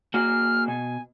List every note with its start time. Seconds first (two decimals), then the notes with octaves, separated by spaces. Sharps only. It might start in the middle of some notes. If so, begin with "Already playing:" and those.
0.14 A#3 F#4 G#4 F6
0.68 B2 G#5